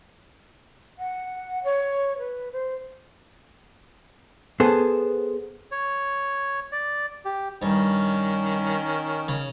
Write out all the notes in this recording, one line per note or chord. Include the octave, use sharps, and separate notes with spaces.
F#5
C#5
B4
C5
B3 G#4 A4 C5
C#5
D5
G4
G2 D#3 C#4
C#3